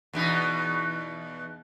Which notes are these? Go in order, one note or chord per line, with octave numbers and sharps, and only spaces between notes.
E2 B2 D#4